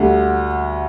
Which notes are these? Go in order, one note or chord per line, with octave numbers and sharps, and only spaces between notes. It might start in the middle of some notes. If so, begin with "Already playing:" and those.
Already playing: D2 D3 G3